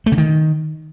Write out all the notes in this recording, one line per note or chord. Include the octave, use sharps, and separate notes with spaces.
A3
C#3
D#3